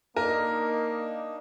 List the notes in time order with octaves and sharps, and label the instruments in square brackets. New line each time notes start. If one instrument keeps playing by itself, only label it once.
[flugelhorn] A#3 [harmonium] D4 D#4 [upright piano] A#4